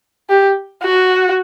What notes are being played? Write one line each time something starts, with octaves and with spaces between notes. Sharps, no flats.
G4
F#4